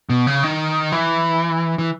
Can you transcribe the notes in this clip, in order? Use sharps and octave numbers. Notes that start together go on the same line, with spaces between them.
B2
C#3
D#3
E3
E3